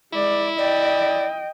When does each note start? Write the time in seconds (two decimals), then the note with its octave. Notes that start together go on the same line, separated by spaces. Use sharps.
0.13 G#3 E4 D5
0.58 D5 D#5 G5